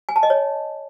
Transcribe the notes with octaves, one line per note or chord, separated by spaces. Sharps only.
G#5
A5
D#5
C#5